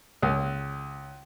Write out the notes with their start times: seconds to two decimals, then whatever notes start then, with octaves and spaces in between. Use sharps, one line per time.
0.22 C#2